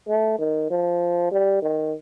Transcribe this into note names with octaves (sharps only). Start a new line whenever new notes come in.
A3
D#3
F3
G3
D#3